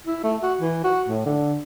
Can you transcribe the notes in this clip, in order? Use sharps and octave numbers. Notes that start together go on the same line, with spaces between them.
E4
A3
F#4
E3
F#4
A2
D3